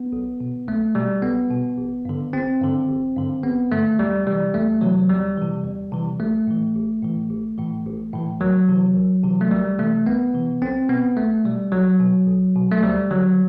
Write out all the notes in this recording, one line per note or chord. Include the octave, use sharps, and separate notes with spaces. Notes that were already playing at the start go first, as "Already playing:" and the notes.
Already playing: B3
B1
B2
B1 A3
B2 G3
B1 B3
B2
A1
G2 D3
A1 C4
G2 D3
A1
G2 D3
A1 B3
G2 D3 A3
E2 G3
C3 E3 G3
E2 A3
C3 E3 F#3
E2 G3
C3 E3
E2
C3 E3
A1 A3
A2 E3
A1
A2 E3
A1
A2 E3
A1
A2 E3
C2 F#3
C3 E3
C2
C3 E3
A3
C2 G3
C3 E3 A3
C2 B3
C3 E3
B1 C4
B2 B3
B1 A3
B2 G3
B1 F#3
B2
B1
B2
A3
D2 G3
D3 F#3